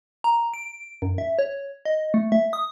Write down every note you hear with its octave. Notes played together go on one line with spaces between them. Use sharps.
A#5
D7
F#2
E5
C#5
D#5
A3
E5
D#6